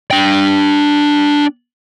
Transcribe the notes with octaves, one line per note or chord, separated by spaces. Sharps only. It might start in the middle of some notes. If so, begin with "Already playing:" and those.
D4 G5